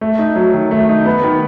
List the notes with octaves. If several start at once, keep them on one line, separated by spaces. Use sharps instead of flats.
A3
D#4
F#3
D#3
A3
D#4
B3
D#3